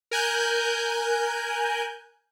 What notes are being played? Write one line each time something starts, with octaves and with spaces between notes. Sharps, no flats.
A#4 G#5 F#6 G6